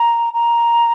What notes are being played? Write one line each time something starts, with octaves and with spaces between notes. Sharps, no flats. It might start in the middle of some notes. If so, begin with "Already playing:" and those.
Already playing: A#5
A#5